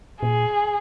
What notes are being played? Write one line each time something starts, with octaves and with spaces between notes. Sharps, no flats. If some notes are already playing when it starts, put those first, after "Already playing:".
A#2 G#4